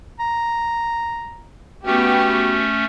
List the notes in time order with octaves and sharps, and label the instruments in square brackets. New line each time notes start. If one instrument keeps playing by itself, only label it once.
[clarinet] A#5
[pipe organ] A3 C#4 [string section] B3 G4 [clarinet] F#4